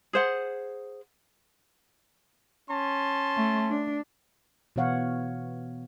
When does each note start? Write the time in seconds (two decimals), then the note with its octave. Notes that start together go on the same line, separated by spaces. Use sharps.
0.13 G#4 C5 F#5
2.70 C#4 A5 C6
3.37 A3
3.70 D4
4.76 B2 E3 B3 C#5 F5 F#5